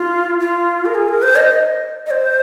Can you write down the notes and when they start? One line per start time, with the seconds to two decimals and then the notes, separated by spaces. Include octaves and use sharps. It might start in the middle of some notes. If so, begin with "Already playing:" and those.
Already playing: F4
0.40 F4
0.85 A#4
0.95 G#4
1.08 A#4
1.22 C5
1.36 D#5
2.06 D#5
2.11 C5